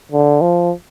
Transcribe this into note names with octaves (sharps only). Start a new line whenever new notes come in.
D3
F3